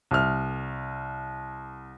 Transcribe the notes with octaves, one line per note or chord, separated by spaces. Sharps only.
C2 F6